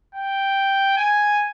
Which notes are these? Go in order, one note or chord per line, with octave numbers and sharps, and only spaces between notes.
G5
G#5